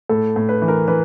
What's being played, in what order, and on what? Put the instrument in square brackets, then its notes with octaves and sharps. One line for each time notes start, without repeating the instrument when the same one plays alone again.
[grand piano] A2 A4
A2
B4
E3
A#4
E3 B4